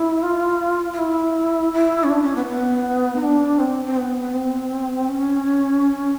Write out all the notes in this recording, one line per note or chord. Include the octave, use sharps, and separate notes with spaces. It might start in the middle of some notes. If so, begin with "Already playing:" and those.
Already playing: E4
F4
F4
E4
E4
C#4
D4
C#4
B3
B3
D#4
D4
C4
C4
B3
C4
C#4